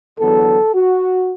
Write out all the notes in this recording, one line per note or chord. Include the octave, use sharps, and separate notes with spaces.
E2 D3 F#3 B3 A4
F#4